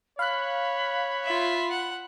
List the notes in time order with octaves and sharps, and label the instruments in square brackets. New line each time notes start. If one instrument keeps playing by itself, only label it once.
[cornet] C#5 [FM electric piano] F5 F#6 [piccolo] B5
[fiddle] F4 E5
F#5